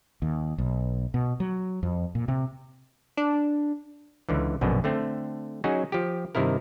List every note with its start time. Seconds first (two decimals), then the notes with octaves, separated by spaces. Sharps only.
0.22 D#2
0.58 B1
1.14 B2
1.40 F#3
1.83 F2
2.15 A#2
2.28 C3
3.17 D4
4.29 C#2 D3 E3
4.61 A#1 F#2 B2 D3
4.84 D3 A3 C4
5.64 F#3 C#4 D#4 F#4 G#4
5.92 F3 G4
6.35 G2 C3 D#3 E4 A#4